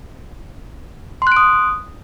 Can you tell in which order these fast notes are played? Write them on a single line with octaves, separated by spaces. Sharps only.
C6 F#6 D7 D#6